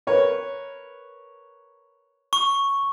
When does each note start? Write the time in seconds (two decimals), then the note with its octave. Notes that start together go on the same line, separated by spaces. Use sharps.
0.07 A#4 B4 C#5
2.33 C#6